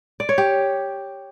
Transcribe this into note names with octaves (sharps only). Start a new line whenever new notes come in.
D5
C#5
G4